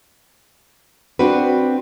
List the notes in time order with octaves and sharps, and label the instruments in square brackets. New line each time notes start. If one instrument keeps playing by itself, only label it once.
[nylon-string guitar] C4 D4 F#4 B4